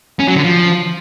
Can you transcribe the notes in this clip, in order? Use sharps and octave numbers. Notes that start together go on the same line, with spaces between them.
C#4
F#3
D3
F3